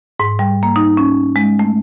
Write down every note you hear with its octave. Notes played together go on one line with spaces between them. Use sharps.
G#2
G3
A#3
D#4
C#4
G#3
A3